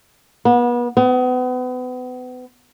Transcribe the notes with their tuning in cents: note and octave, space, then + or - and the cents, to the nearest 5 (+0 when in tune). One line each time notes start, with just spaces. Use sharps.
B3 -35
B3 +35